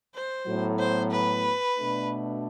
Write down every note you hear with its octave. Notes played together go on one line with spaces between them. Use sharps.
C5
A2 F#3 B3
C5
B4
B2 A3 D4